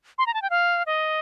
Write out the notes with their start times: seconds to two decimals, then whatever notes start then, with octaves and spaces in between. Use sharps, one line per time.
0.18 C6
0.27 A#5
0.34 A5
0.42 G5
0.50 F5
0.86 D#5